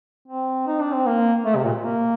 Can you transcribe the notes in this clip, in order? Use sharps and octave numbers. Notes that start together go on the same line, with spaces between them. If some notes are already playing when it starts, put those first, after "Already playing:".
C4
D#4
D4
C4
A#3
A3
C3
A#2
A#3